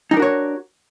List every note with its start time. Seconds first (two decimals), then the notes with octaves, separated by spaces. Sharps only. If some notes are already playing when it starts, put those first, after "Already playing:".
0.11 D#4
0.14 D4
0.17 A#4
0.19 F#4
0.22 C#5